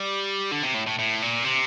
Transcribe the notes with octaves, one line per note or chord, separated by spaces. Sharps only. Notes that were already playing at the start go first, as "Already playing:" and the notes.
Already playing: G3
D3
C3
A2
A2
A2
A#2
C3